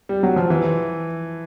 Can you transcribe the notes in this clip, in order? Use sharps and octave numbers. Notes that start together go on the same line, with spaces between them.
G3
F#3
F3
E3